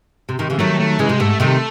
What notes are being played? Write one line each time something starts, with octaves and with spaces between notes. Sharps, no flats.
C3
C3 D#3
C#3 E3
D#3 F#3 A3
A3
C#3 E3 G#3
C3
G#2 A3
C3 D#3 A3